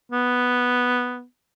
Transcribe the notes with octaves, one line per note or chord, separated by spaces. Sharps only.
B3